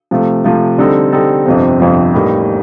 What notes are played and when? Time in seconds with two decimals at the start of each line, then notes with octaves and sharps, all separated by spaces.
0.11 C3 F3 A3
0.44 C3 F3 A3
0.78 D3 G3 C4 D#4 A4
1.12 D3 G3 C4 D#4 A4
1.46 G1 F2 C3 F3 C4
1.80 G1 F2 C3 F3 C4
2.14 A1 A2 G3 A#3 D#4